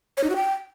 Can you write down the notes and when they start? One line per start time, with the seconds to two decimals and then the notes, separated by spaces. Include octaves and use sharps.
0.17 C#5
0.24 D#4
0.30 F#4
0.36 G5